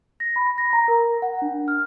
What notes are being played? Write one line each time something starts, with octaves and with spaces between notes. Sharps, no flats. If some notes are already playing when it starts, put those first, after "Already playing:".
A#6
B5
A#6
A#5
A#4
F#5
D4
F6